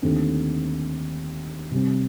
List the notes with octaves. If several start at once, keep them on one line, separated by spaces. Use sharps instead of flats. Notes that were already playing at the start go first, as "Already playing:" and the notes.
D#2 D3 A3 C4
C3 G3 C4